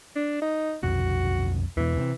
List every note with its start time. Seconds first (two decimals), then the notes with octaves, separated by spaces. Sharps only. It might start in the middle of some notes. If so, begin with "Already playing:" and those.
0.16 D4
0.42 D#4
0.83 B1 F2 C3 F#4
1.77 E2 B2 E3
1.97 C3 F#3 C4